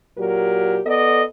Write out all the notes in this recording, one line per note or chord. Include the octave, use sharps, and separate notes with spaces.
A#2 F#3 G4 A#4
B3 A4 D5 D#5